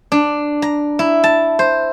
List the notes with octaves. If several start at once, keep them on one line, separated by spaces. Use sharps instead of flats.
D4
A#5
E4
A5
C5